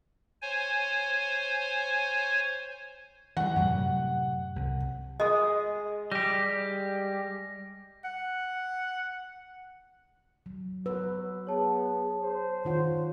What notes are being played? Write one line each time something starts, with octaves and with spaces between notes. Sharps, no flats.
C5 C#5 G#5
E3 G3 F#5
F#2 A2 C3
C2
G#3 D#5 D#6
G3 G4 A#6
F#5
F#3
F#3 B4 E6
B3 G#4 C#5 A5
C5
D#3 F4 C#5 F#5